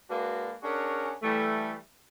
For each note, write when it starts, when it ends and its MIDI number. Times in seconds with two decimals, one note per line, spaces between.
0.10 0.52 56
0.10 0.52 58
0.10 0.52 62
0.10 0.52 66
0.10 0.52 71
0.63 1.11 61
0.63 1.11 62
0.63 1.11 66
0.63 1.11 68
0.63 1.11 70
1.23 1.75 52
1.23 1.75 55
1.23 1.75 57